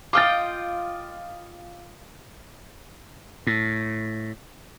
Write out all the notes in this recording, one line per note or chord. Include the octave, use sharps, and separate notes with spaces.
F4 D#5 G5 D6 F6 A6
A2